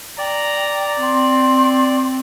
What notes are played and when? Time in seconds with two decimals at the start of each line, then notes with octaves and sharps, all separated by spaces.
0.18 D5 G5 A#5
1.01 C4 C6